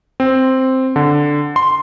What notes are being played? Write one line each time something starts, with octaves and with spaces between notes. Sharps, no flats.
C4
D3
C6